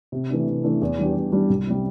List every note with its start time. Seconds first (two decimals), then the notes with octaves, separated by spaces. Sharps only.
0.12 C3
0.30 E3 A3 D4
0.47 C3
0.63 E3 A3 D4
0.81 E2
0.98 E3 G3 D4 G4
1.15 E2
1.32 E3 G3 D4 G4
1.49 C2
1.67 C3 G3